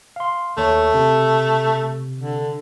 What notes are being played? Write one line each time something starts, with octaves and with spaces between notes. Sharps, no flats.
F5 C6
D#2 A3 C#5
C3
D3